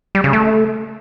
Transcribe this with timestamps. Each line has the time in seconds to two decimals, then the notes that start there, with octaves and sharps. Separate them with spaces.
0.15 G3
0.24 C#3
0.33 A3